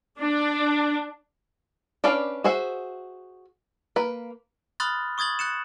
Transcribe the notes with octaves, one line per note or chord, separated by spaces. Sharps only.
D4
C#4 D4 B4 D5 F5
F#4 G#4 C5 E5 F#5
A#3 B4
B5 C6 D#6 F6 F#6 A6
C#6 D#6 G#6 A6 F#7
F#6 A6 C#7 E7